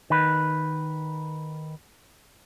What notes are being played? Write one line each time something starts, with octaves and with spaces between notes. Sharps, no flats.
D#3 B4